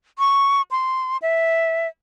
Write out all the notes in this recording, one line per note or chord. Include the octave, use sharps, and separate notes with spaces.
C#6
C6
E5